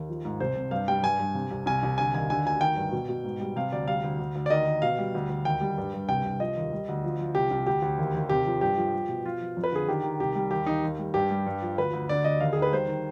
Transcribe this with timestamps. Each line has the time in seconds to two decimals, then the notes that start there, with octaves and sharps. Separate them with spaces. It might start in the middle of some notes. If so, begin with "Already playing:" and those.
Already playing: D#2
0.09 F3
0.25 G#2
0.40 C2 C5
0.55 C3
0.71 G2 F5
0.88 G3 G5
1.03 G2 G#5
1.19 G2
1.35 C3
1.51 C2
1.66 C2 G#5
1.83 C2
1.98 D3 G#5
2.14 D#2 G#5
2.30 D3 G#5
2.45 D2 G#5
2.61 D#3 G5
2.76 G2
2.92 B2
3.09 B2
3.24 G#2
3.40 G3
3.56 C3 F5
3.72 D2 D5
3.87 G3 F5
4.04 D2
4.19 D2
4.35 D2
4.46 D5
4.50 D#3 D#5
4.67 D#3
4.82 B2 F5
4.99 G3
5.15 D2
5.30 D2
5.45 D#2 G5
5.61 G3
5.78 G2
5.94 G2
6.08 C2 G5
6.24 C2
6.40 F3 D#5
6.57 D#2
6.72 G3
6.88 D2
7.04 F3
7.19 F3
7.35 C2 G4
7.50 C2
7.67 D2 G4
7.82 D2
7.98 D#2
8.14 D#2
8.29 C3 G4
8.46 F3
8.61 G2 G4
8.77 F3
8.93 G3
9.08 B2
9.25 F3 F4
9.41 F3
9.57 F2
9.64 B4
9.72 D3 G#4
9.88 D#3 G4
10.03 D#3
10.19 C2 G4
10.35 G3
10.51 D#2 G4
10.66 D#2 D#4
10.83 D#2
10.99 G3
11.14 G2 G4
11.30 G3
11.46 G2
11.62 F3
11.78 D2 B4
11.93 D2
12.09 D3 D5
12.24 D2 D#5
12.40 D#2 F5
12.53 D#3 G#4
12.62 B4
12.72 G3 C5
12.88 D#3